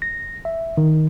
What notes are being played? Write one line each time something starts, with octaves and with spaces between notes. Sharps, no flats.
A#6
E5
D#3